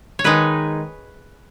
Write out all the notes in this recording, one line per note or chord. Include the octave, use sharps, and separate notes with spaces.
C#5
D#3 G#3 D#4 B4